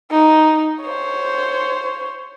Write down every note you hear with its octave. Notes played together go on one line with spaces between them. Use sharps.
D#4
C5 C#5